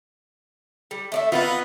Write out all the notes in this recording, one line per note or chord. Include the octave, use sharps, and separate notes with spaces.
G3
A3 D5 E5
B3 C4 D#4 F4 B4